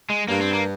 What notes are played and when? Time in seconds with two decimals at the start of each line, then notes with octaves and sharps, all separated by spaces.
0.10 G#3
0.29 G2 A#3
0.41 C4
0.53 A#3